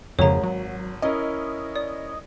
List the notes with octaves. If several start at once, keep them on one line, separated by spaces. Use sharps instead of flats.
G#1 F2 C#3 C#5 A#5
F#3
C#4 E4 A#4 D#5
D5